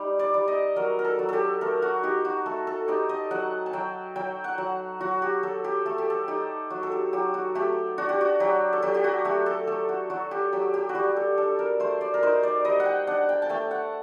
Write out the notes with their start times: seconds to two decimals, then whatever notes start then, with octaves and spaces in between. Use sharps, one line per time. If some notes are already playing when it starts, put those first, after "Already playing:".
Already playing: G3 D#4
0.19 D5
0.34 G3
0.48 D#5
0.76 F#3 A#4
0.99 A#4
1.05 A4
1.19 F#3
1.29 G4 A4
1.61 A3 A#4
1.82 F#4
2.03 D#4 G4
2.25 F#4
2.46 A3 A4
2.67 A4
2.88 D#4 G4
3.09 D#5
3.31 F#3 F#5
3.66 A5
3.73 F#3 G5
4.16 F#3 G5
4.44 F#5
4.58 F#3
5.01 F#3 F#4
5.22 G4
5.43 F#3 A4
5.64 G4
5.86 A3 A4
5.98 G4
6.10 A4
6.28 D#4 G4
6.70 F#3 F#4
6.83 A4
6.92 G4
7.13 F#3 G4
7.34 F#4
7.55 A3 G4
7.98 D4 F#4
8.09 G4
8.21 F#4
8.40 F#3 G4
8.73 A4
8.83 F#3 G4
8.94 G4
9.04 F#4
9.25 A3 G4
9.46 A4
9.67 A3 A4
9.89 F#4
10.10 F#3 F#4
10.31 G4
10.52 F#3 G4
10.74 G4
10.89 F#4
10.95 G3 G4
11.16 A4
11.37 D4 A4
11.59 A#4
11.80 A3 C5
12.01 D5
12.14 A#4
12.23 D#4 C5
12.43 D5
12.65 G3 D#5
12.80 F#5
12.86 G5
13.07 D4 F#5
13.29 G5
13.42 A5
13.49 A3 G5
13.71 F#5